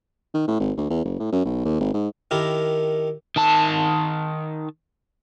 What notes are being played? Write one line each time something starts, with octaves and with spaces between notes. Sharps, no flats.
D#3
A2
G#1
D2
E2
F#1
A2
F#2
B1
D#2
G#1
G#2
D#3 E4 G4 A4 A#4
D#3 A5